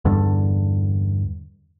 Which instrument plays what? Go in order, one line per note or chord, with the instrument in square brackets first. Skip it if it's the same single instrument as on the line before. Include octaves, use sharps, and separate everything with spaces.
[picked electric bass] E2 G2 D3